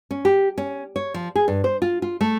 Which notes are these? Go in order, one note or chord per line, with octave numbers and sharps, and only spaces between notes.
C#4
G4
C#4
C#5
F3
G#4
G2
C5
F4
F4
A3